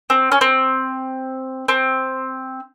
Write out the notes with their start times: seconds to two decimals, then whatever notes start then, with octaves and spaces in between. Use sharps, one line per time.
0.10 C4
0.32 C#4
0.41 C4
1.68 C4